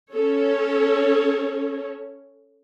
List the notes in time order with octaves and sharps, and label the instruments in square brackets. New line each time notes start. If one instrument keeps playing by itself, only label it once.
[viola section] C#4 A4 C#5